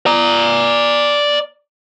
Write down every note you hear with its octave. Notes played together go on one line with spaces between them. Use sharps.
D5 A#5